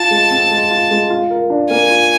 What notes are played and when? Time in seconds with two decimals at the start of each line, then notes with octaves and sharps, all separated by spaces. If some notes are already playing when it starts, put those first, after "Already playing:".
Already playing: F4 A5
0.11 G#3
0.31 C4
0.51 G#3
0.70 F4
0.91 G#3
1.10 F4
1.31 A#4
1.50 D4
1.70 A#3 G#5
1.90 F4